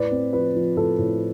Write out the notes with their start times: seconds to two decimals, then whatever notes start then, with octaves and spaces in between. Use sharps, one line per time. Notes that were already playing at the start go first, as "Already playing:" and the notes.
Already playing: A2 B4 D5
0.11 C4
0.33 F3 B4
0.55 F3
0.77 A2 A4
0.99 A2